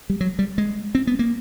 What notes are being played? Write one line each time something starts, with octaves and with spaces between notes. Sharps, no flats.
G3
F#3
G3
G#3
C4
B3
A#3